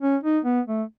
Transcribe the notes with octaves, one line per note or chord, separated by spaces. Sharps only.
C#4
D#4
B3
A3